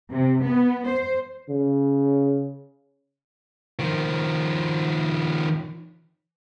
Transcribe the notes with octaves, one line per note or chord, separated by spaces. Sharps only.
C3
B3
C5
C#3
D#3 F3